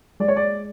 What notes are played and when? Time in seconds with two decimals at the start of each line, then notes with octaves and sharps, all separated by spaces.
0.20 G#3 D5
0.28 C#5
0.37 D5